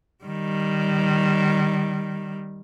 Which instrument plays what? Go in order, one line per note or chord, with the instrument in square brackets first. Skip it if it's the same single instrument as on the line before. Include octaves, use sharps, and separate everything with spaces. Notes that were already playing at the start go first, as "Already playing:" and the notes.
[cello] D#3 G3